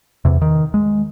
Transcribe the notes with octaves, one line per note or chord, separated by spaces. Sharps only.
E2 C3
D#3
G#3